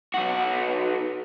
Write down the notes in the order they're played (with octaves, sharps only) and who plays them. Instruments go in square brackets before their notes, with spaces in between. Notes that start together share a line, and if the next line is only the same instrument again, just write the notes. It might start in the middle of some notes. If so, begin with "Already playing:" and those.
[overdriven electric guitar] B1 F#4